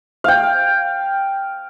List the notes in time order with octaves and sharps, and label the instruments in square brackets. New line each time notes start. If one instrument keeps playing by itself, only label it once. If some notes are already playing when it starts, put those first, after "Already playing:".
[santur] F5 G5